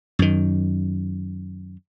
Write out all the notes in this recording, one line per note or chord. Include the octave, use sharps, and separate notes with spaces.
F#2 D#3